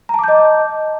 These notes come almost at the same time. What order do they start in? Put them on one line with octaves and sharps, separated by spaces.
A#5 A5 D6 G6 D#5